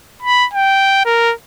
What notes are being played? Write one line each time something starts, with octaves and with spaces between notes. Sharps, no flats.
B5
G5
A#4